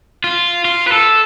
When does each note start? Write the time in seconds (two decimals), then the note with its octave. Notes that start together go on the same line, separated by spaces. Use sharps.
0.24 F4
0.65 F4
0.88 B4
0.92 A4